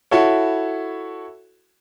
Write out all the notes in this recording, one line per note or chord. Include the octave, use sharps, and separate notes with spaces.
E4 F#4 A4 C#5